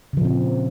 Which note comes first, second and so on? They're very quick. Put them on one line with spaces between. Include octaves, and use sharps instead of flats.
C#3 F3 A#2 C4